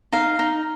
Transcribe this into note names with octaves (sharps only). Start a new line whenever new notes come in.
D#4 F5
D#4